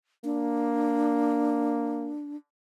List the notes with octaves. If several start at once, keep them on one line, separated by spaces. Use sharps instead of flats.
A#3 D4